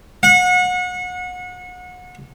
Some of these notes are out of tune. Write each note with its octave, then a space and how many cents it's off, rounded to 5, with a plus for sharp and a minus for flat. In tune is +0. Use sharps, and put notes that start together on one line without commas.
F#5 -30